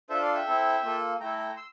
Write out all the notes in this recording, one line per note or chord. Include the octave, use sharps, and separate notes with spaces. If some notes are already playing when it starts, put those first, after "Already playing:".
D4 F4 A4 C5 E5
D5 F5
E5 G5
C4 E4 A4
A#3 F4 A4
A3 E4 A4 G5 A#5
G5 A#5
C6 E6